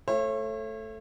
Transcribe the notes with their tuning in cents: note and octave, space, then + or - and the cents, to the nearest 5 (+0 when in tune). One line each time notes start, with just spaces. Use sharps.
A3 +0 C#5 -35 E5 +35